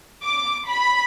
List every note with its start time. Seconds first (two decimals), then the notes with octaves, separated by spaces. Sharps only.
0.25 D6
0.67 B5